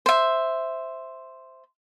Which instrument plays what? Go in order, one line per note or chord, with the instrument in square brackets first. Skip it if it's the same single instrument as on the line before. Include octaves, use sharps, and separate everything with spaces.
[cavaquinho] C5 E5